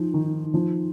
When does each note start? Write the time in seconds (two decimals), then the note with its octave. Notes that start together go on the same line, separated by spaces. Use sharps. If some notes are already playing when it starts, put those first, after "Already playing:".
Already playing: F3 D#4
0.14 D#3
0.54 F3 D#4